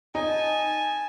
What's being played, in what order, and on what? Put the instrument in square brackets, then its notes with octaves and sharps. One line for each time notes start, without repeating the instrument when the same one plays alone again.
[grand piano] D#4 [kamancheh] G#5 A5